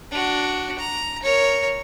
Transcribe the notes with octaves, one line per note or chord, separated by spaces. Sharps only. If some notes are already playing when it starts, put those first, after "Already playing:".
D4 F#4
A#5
A#4 C#5